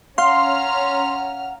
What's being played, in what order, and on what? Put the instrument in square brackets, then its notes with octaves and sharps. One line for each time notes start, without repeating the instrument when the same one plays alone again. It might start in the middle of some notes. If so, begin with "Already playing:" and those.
[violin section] C#4 A#5 F6 [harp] F5 [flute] F#5 [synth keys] C6